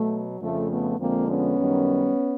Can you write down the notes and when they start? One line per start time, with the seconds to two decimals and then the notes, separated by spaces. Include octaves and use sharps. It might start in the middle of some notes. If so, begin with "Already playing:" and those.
Already playing: B2 F#3 A3
0.41 F2 C#3 F3 A3
0.70 A3 B3
0.98 F2 D3 F3 G#3 A#3 C4
1.27 B3 C#4
1.56 F#2 D#3 G3